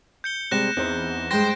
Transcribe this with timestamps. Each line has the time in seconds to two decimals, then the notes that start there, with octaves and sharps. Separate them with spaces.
0.24 G6 C#7 G7
0.51 C3 G3 G#3 F#6 A#6 E7
0.76 E2 C4 D#4 C5
1.31 G2 G#3 C5 G5 G6 A#6